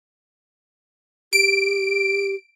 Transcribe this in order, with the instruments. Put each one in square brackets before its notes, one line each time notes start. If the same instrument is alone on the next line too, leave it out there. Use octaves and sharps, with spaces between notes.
[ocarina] G4 [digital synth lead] D7